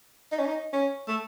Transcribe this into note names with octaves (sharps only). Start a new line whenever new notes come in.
D#4
C#4
D#4
C#4
A3